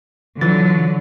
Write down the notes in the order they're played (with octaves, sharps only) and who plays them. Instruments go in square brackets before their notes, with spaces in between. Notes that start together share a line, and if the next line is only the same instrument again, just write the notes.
[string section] D3 F#3 [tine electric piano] E3 F4 A6